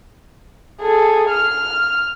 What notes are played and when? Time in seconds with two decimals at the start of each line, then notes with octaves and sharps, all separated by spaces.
0.81 G#4 A4
1.30 F6